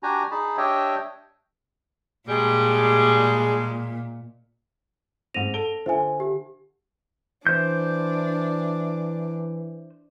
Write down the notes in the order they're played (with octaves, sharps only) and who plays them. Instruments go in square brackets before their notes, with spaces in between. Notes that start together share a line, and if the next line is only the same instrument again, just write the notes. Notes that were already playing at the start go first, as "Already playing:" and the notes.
[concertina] D4 F#4 G4 G#5 A#5
D#4 G#4 A5 B5
D4 G4 C#5 D#5 E5 G5
[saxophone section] G2 G3 [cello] A#2 [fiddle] G#3 [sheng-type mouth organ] G#4
[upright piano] G#2 C4 [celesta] A#6 D#7 F7
[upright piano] A4 D7 G7
[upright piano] D3 F4 [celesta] C5 E5 G#5
[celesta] G4
[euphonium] E3 [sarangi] D4 [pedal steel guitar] C5 G6